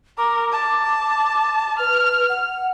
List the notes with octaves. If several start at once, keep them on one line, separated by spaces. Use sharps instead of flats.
A#4 D6
A5
B4 F6
F#5